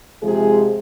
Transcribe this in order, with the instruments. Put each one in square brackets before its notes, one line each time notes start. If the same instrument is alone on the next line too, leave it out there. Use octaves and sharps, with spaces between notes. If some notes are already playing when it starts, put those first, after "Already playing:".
[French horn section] C3 F3 G#3 G#4